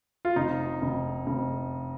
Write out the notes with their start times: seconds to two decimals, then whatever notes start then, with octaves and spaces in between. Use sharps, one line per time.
0.25 F4
0.36 F1 D#4
0.82 F1
1.27 F1